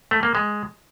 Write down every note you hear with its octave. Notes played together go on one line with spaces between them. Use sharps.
A3
A#3
G#3